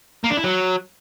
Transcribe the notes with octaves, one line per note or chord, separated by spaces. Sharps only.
A#3
D4
E4
F#3